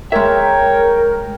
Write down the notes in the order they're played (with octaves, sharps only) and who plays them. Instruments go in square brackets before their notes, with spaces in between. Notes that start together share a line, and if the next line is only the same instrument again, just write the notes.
[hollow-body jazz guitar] G#3 E5 [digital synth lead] A#4 [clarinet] C#5 [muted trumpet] G5